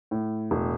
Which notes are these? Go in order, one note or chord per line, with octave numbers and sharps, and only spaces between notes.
A2
E1